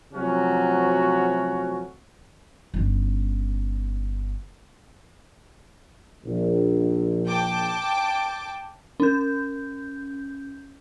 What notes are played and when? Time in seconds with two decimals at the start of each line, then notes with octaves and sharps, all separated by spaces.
0.14 C3 F3 F#3 A3 C#4 F#4
2.74 G1 C#4
6.25 A#1
7.26 G5 A5 D6
9.00 C#4 G6